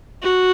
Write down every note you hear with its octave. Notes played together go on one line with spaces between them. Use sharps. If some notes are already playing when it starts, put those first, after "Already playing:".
F#4